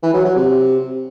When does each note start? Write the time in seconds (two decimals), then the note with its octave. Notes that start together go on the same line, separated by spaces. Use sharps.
0.03 E3
0.14 F#3
0.25 F#3
0.36 C3